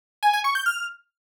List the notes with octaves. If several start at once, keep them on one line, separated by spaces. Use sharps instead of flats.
G#5
G#5
C#6
G6
F6